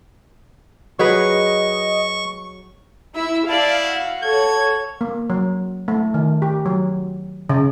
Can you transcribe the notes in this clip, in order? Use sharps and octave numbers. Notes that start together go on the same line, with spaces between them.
F#3 G#4 B4 D#5 C#6
E4 E5
E4 D5 F5 A5
F#4
A4 C#5 G#6
A#3
F#3
A3
D#3
G4
F#3
C#3